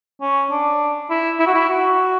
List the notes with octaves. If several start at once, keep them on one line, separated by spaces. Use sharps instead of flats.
C#4
D4
E4
E4
F#4
E4
F#4